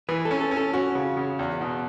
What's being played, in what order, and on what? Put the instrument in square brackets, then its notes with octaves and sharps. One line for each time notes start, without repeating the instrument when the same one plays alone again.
[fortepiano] E3 [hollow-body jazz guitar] B4
[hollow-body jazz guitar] A4
[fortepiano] C#4
[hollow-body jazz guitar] A4
[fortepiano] C#4
[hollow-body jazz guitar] A4
[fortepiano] C#4 [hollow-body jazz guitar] F#4
[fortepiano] C#3
C#3
E2
B2